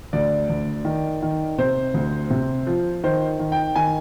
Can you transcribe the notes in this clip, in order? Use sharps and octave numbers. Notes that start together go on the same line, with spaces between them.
D2 D5
D2
D#3
D#3
C3 C5
D2
C3
F3
D#3 C5
D#3
G5
D#3 G#5